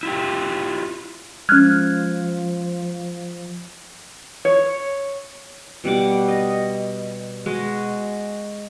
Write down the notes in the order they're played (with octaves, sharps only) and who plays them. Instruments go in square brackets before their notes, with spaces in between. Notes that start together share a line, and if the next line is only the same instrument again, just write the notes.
[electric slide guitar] E4 F4 G4
[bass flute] F3 [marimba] G#3 C#4 [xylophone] F6 F#6 G#6
[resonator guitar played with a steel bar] C#5
[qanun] B2 G3 F#5 D6
D#5
G#3 F#4